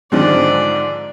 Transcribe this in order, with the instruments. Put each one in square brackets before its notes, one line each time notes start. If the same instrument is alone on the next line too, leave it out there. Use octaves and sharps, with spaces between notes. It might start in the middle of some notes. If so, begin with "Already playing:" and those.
[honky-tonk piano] G#2 D3 G#3 [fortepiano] D#3 F3 [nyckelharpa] D5